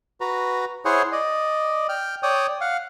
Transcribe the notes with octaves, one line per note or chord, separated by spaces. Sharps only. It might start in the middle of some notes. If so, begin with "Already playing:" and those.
F#4 B4 A#5
E4 G#4 C5 C#5 F#5 G#5
D5 D#5
G5 F6
C#5 D5 G5 D#6
F5 F#5